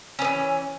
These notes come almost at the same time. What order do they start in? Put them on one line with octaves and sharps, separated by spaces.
C#4 B3 E3